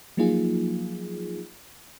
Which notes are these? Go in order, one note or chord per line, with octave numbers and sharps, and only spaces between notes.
F3 F#3 A#3 D#4 F4 G#4